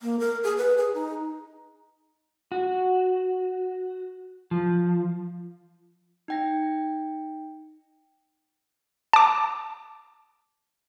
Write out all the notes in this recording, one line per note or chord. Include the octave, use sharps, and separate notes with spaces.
A#3
A#4
G#4
B4
G#4
D#4
F#4
F3
D#4 G5 A#6
A5 D6